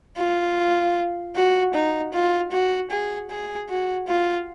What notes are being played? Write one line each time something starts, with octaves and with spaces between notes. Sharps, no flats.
F4
F#4
D#4
F4
F#4
G#4
G#4
F#4
F4